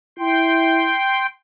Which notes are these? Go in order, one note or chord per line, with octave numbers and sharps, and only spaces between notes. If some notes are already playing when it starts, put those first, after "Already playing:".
E4 G5 C6